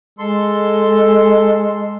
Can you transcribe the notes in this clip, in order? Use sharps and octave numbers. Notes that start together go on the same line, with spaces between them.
G#3 A4 C6